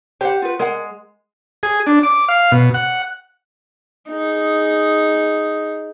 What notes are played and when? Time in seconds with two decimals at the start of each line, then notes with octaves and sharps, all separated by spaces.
0.21 G4 C5 F#5
0.42 F4 F#4 B4
0.59 G#3 A#4 F#5
1.63 G#4
1.87 D4
2.03 D6
2.29 F5
2.52 B2
2.74 F#5
4.09 D#4 G#4